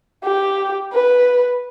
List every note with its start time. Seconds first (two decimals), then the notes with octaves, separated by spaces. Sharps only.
0.24 G4
0.93 B4